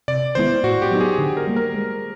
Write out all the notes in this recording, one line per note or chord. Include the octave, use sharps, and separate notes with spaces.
C3 D5
D#3 G#3 B3 E4 C5
A2 F#4
G4
F#3 B3 D#4
G#4
D3
A#4
G3 A#3
A#4
G#3